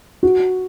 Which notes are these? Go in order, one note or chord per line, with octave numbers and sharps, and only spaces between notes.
F#4